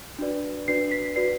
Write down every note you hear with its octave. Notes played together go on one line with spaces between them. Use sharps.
D4 F#4 B4 D5
D4 F#4 B4 D5 C7
B6
F#4 B4 D5 C7